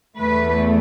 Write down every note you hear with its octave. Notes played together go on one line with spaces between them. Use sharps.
E2 E3 A3 B4